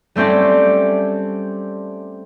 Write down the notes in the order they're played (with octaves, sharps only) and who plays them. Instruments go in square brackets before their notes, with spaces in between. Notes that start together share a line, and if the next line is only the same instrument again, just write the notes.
[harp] G3 A3 C4 C#4 G4